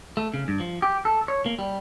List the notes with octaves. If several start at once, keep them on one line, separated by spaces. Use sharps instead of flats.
A3
C#3
G2
F3
G4
A4
C#5
A#3
G3